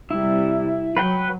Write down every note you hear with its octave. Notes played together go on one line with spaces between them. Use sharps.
C3 G3 E4
F#3 B4 F#5 G5